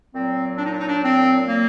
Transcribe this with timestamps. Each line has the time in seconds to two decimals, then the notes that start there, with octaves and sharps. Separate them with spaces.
0.14 A#2 F#3 C4
0.58 D4
0.66 D#4
0.73 D4
0.81 D#4
0.87 D4
1.03 C4
1.48 A#3